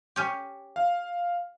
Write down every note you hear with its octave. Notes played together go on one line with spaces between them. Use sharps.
C#4 G4
F5